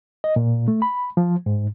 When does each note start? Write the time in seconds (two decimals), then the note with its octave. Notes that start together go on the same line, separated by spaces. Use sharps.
0.24 D#5
0.36 A#2
0.68 A3
0.82 B5
1.17 F3
1.46 G#2